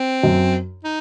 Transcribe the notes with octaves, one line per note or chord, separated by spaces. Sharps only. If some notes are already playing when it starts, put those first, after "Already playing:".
Already playing: C4
F#2
D#4